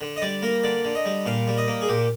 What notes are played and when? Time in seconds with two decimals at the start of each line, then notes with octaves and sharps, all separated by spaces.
0.01 D3
0.16 D#5
0.22 G3 D5
0.42 A#3 A#4
0.64 D3 D5
0.85 D3
0.95 D#5
1.05 G3
1.26 A#2 F5
1.47 G3
1.58 D#5
1.68 A#3
1.82 G#4
1.89 A#2 G4